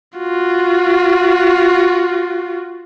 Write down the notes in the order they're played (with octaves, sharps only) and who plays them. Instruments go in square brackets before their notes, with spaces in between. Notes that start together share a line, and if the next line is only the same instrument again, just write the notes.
[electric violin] F4 F#4